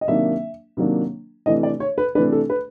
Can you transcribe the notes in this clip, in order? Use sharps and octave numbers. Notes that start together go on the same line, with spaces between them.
D#5
C3 D#3 F#3 A#3 D4 E5
C3 D#3 F#3 A#3 D4
C3 E3 A3 D4 D#5
D5
C#5
B4
C3 E3 A3 D4 B4
A4
B4